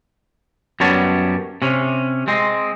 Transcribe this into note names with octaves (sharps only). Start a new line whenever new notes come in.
F#2 G3 B3 C#5 A5
C3 C#4
G#3 C4